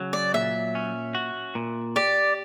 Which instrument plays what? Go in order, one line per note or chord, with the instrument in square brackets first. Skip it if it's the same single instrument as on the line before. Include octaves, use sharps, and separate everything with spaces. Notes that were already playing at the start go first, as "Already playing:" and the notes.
Already playing: [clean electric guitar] C#3 F#3
[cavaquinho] D5
[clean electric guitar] A#2 [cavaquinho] E5
[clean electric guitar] C#4
F#4
A#2
[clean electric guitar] G4 [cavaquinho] D5